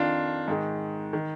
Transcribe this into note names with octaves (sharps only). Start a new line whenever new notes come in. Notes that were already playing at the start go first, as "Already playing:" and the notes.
Already playing: F2 D#3 D4 F4
G#2 D#3
D#3